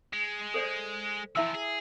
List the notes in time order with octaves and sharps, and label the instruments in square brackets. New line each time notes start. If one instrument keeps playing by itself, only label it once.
[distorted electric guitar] G#3
[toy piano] A4 C5 D5
[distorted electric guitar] E3 F3 [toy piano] E4 E5 E6
[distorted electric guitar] G#4